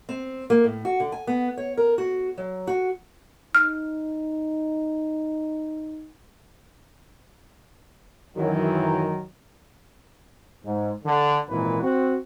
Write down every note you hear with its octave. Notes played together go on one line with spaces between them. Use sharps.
C4
A#3
A2
F#4
D3
G#5
B3
C#5
A#4
F#4
F#3
F#4
D#4 F6
F#2 D#3 E3 F#3
G#2
D3
G#1 A#2 E3 B4
C4 F#4